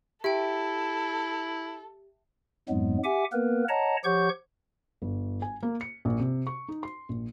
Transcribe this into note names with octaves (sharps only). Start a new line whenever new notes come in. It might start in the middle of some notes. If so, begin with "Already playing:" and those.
E4 G4 A4 E5 G5
F2 G#2 F#3 G#3 B3
G4 E5 F#5 G#5 D6
A#3 B3 A#4 B4
C#5 D#5 F#5 A5 A#5
F3 G4 C#5 F#5 C#6 G6
G1
G#5
A#3
C#7
A#1
C3
C#6
D#4
C6
A#1